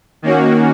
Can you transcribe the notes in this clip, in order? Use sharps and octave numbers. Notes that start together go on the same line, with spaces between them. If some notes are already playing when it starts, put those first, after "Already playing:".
D#3 A#3 C#4 F#4